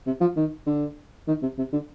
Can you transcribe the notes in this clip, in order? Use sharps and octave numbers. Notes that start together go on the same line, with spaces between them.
C3
F3
D#3
D3
D#3
C3
C3
D3